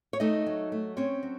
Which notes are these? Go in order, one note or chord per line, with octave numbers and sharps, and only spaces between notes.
C#5
A3 D#4 D#5
F#3
A3
C4 C#4 C#5
F#3